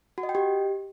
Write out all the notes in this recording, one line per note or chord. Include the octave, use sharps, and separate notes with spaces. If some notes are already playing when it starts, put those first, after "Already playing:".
F#4
D#5
G5
G4